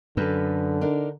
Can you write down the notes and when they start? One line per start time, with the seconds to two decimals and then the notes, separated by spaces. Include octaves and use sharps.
0.17 F#2 D3 A4 B4
0.81 D4 D#4 A#4